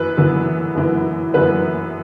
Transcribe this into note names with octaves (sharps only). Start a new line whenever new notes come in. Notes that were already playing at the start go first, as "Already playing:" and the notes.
Already playing: F#2 E3 B4
F#2 E3 B3
F#2 E3 B3
F#2 E3 B3 B4